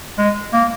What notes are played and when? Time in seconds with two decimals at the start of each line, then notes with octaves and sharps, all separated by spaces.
0.18 G#3
0.53 A#3